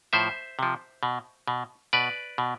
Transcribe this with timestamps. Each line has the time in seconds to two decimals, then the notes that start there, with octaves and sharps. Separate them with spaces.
0.13 A2 F3 C5 E5
0.59 C3 F3
1.03 B2
1.48 B2
1.93 B2 B4 D5
2.38 B2